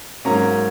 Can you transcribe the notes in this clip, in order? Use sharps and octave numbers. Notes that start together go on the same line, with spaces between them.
G#2 F#3 A#3 C#4 A#5